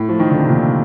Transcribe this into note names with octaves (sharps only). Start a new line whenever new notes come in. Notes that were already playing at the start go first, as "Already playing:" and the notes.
Already playing: A2
F3
D#3
D3
C3
A#2